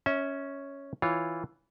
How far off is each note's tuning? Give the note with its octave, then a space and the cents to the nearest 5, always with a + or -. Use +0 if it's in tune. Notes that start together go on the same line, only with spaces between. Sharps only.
C#4 +0 E5 -30
E3 +0 F4 +0 C#5 +0